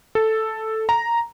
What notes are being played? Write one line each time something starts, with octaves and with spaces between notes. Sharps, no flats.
A4
A#5